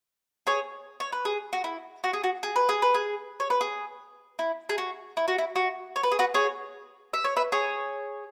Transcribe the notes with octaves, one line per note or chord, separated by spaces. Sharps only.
G#4 C#5
C#5
B4
G#4
F#4
E4
F#4
G#4
F#4
G#4
B4
G#4
B4
G#4
C#5
B4
G#4
E4
G#4
F#4
E4
F#4
E4
F#4
C#5
B4
G#4
F#4 B4
G#4 C#5
E5
C#5
B4 E5
G#4 C#5